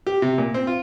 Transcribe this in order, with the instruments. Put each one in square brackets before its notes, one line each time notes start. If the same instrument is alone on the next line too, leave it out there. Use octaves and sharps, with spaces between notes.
[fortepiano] G4
C3
A#2
C4
F4